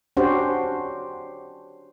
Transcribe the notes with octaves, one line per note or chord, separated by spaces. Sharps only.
C#4 D4 F#4 G4 C5